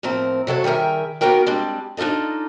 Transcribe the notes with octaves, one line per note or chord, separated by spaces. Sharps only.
A2 F3 C4 A#4
C3 F#3 A4 C#5
D#3 G3 G#4 A#4 E5
A#3 B3 D#4 F#4 A#4 G5
G3 G#3 C4 D4
D4 D#4 F4 A4 D#5